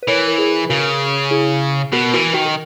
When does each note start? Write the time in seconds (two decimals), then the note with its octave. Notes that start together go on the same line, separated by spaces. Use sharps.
0.03 B4
0.08 E3 A#4 C#5
0.28 A#4
0.38 G#4 B4
0.69 C#3 F#4 A#4
1.31 E4 G#4
1.93 B2 F#4 A#4
2.14 E3 F#4 A#4
2.33 D#3 F#4 A#4
2.46 A#4